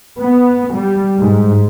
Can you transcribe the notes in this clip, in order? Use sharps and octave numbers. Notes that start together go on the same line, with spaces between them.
B3
G3
G#2